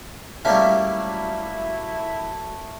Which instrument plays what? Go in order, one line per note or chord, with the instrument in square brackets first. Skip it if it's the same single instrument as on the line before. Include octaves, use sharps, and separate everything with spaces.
[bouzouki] F#3 E5 G5 [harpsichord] G3 A#3 C#4 [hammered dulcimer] A3 [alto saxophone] E4